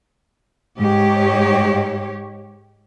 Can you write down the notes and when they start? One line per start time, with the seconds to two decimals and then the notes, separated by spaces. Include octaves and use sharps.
0.78 G#2 G4 C#5